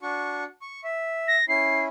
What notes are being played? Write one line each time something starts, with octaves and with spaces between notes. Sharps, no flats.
D4 F#4 C#6
C#6
E5
A#6
C#4 E4 C7